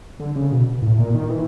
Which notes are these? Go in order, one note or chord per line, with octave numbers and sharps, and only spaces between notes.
D3
C#3
B2
A2
A#2
D#3
E3